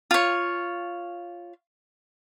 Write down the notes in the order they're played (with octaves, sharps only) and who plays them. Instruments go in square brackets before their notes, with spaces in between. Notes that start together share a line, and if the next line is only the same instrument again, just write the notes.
[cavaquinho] F4 C#5